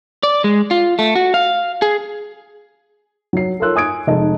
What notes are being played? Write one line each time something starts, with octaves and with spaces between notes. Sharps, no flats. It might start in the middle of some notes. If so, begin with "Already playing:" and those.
D5
G#3
F4
A3
F#4
F5
G#4
F#3 C7
A4 A#4 C#5 C6 E6 F#6
G#5 D#6 G#6 D7
F1 G#3 D#4 D#5 A5